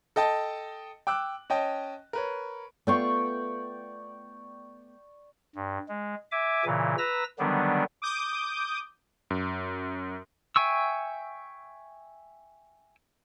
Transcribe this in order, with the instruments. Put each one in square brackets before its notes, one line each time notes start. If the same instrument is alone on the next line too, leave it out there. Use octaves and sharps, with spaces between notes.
[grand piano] A4 D#5 G5 A5
G5 D6 E6 F#6
C#4 D#5 G5 A5
A#4 B4 C#5
[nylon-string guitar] A3 B3 F4 [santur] D5 G5 C#6
[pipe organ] G2
G#3
E5 G#5 D6
A#2 C#3 E3
B4 A#5 E6 A#6
D3 D#3 F#3 G3 B3 D4
[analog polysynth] D6 D#6 G6
[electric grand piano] F#2
[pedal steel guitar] E5 G5 G#5 C#6 E6